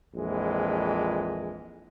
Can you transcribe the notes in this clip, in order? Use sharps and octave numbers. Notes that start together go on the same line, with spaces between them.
A#1 F2 E3 G#3